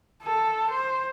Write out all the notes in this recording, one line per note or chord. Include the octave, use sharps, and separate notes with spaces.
A4
C5